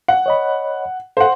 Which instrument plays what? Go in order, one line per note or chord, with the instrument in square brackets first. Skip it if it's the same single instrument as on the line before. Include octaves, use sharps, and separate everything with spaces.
[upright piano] F#5
[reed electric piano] C#5 D#5 B5
[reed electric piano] A4 [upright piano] C5 F#5